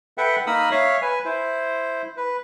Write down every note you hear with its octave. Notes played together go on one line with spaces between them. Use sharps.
A4 B4 E5 F#5 G5
A#3 D#4 A#4 B5 D#6 E6
C#5 E5 F5
B4 G#5
E4 C5
B4